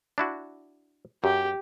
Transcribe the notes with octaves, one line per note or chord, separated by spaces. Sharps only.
D4 E4 F#4
F#2 G4